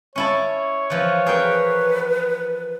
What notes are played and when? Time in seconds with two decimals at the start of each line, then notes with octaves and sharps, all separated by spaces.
0.16 C#4 E4 C#5 A5
0.90 E3 F3
1.26 G#4 A#4 B4 G5